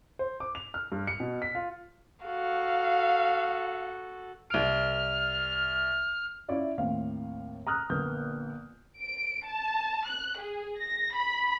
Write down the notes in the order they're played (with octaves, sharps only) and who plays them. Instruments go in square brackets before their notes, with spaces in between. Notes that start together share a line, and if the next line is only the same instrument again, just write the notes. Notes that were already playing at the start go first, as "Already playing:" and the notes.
[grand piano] C5
D6
F7
F6
G2
C#7
B2
B6
F4
[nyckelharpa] F#4 A4 [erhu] F5
[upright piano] C2 D7 [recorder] F6
[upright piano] C#4 E4 F4 C#5 D5 E5
D#2 A2 C4 F5
A#5 D#6 F6 F#6
A#1 D3 A#3 B3 G6
[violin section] D7
A5
F#6
G#4
A#6
B5